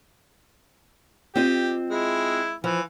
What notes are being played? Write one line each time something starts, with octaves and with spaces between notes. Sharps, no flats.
C4 F4 G4 D#5
G#3 E4
E3 F3